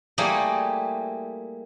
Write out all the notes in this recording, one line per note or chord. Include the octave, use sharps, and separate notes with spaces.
G3 A3 A#3 E4 G4 G#4